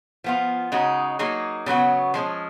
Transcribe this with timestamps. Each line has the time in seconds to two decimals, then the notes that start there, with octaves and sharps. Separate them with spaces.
0.24 F3 B3 F4
0.72 C#3 G#3 D#4 F#4
1.19 F#3 A#3 D#4 G#4
1.66 C#3 F#3 B3 F#4
2.14 F3 G#3 C#4